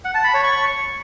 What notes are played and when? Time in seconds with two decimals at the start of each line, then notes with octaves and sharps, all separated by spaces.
0.05 F#5
0.14 A5
0.24 B5
0.34 C#5
0.44 C#6